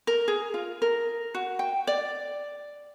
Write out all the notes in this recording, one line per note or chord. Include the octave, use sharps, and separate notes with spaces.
A#4
G#4
F4
A#4
F#4
G5
D5